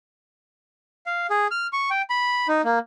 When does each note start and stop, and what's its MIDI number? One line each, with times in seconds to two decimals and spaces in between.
1.06 1.27 77
1.30 1.47 68
1.51 1.67 89
1.73 1.90 85
1.90 2.02 79
2.10 2.47 83
2.48 2.62 63
2.64 2.79 58